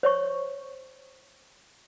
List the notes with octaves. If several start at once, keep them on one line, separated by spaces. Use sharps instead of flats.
C5 C#5 C#6